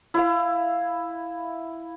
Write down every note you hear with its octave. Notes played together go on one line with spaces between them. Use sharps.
E4 F5